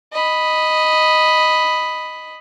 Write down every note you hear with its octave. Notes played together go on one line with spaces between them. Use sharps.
D#5 B5